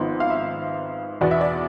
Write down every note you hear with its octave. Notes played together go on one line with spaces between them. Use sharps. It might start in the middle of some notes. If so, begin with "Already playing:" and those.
Already playing: G#1 G#2 F3 B3
F5
E5
E2 B2 B3 D5
E5
D5